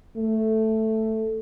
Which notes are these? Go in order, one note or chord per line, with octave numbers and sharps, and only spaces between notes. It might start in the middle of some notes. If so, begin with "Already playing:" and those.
A3